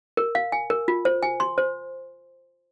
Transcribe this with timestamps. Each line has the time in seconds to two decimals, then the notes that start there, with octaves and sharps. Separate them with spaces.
0.17 A#4
0.35 F5
0.52 G#5
0.70 A#4
0.88 F4
1.05 C5
1.23 G#5
1.40 C6
1.58 C5